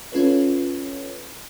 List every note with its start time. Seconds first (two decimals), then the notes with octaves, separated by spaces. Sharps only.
0.12 C#4 F4 A4 B4 C#5